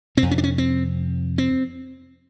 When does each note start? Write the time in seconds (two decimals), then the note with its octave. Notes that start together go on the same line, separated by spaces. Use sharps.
0.17 C3 C4
0.22 F2
0.31 C#4
0.38 D4
0.44 C#4
0.58 C4
1.38 C4